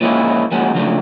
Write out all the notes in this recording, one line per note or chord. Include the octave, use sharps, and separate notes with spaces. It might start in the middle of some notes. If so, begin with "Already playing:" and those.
A#2 F3 G#3 A#3 C#4 E4
F3 G#3 A#3 C#4 F#4 G#4
C#3 F3 F#3 A3 D4